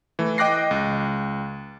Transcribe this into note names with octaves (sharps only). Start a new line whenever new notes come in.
E3 A3
D#5 G5 D6 F#6 A#6 C7
C#2